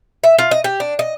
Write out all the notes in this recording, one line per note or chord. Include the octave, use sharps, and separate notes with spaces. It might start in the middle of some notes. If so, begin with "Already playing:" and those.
E5
F4
D#5
G4
D4
D#5